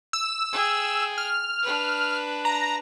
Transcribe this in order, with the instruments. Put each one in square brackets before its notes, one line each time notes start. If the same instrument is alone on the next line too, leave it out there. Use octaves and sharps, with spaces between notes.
[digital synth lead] E6
[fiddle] G#4 G5
[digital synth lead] F6
[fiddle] D4 B4
[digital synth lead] A#5